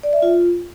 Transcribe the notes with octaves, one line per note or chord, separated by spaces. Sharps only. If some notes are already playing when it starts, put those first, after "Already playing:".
D5
E5
F4